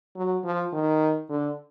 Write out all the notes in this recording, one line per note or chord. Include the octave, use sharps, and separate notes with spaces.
F#3
F3
D#3
D3